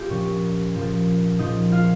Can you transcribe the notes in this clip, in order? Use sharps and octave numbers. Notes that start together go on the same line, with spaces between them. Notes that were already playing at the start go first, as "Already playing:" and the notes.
Already playing: F4 G4
A#2 F3 C#4 C#5
A#2 F3
A#2 F3 D#4 D#5
F4 F5